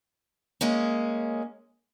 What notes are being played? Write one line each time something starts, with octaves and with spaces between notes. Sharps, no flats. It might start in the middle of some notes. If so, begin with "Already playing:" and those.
G#3 A#3 C#4